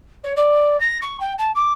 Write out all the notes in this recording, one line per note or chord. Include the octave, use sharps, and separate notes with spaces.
C#5
D5
A#6
C#6
G5
A5
D6